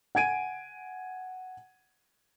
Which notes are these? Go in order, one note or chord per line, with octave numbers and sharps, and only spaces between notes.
F#5 G#5 G#6 D7 D#7